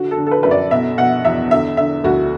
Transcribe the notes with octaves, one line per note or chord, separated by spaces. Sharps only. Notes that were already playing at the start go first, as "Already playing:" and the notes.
Already playing: D3 F#4
A4
D3
A4
B4
F#2 B4
D5
B2 E5
B2 F#5
E2 E5
D3 E5
D3 E5
D2 F#4